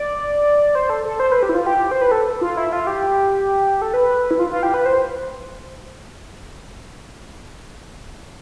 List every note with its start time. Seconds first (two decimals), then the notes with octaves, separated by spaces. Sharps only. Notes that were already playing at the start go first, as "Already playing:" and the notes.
Already playing: D5
0.75 C5
0.90 A4
1.05 A4
1.20 C5
1.32 B4
1.43 G4
1.49 E4
1.55 F4
1.66 G4
1.91 C5
2.01 B4
2.11 A4
2.41 F4
2.57 E4
2.73 F4
2.87 G4
3.82 A4
3.94 B4
4.31 E4
4.39 F4
4.51 F4
4.63 G4
4.74 B4
4.86 C5